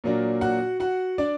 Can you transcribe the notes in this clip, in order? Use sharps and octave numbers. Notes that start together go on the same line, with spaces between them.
A#2 F#3 A#3 D4
F#4 F#5
F#4 F#5
D4 D5